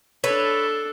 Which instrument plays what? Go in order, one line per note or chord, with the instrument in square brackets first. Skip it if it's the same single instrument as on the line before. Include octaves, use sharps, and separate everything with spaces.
[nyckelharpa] D4 A4 [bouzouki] B4 C#5